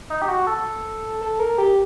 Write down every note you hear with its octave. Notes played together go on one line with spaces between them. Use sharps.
D#4
G4
F#4
A4
A4
A#4
G4